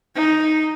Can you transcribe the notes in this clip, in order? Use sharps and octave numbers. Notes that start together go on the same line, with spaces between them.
D#4